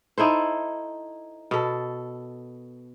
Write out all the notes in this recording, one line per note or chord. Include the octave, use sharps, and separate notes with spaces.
D#4 E4 A4 C5
B2 A4